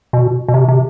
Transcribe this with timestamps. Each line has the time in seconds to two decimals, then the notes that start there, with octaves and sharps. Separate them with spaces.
0.13 B2
0.48 B2
0.54 C3
0.68 C3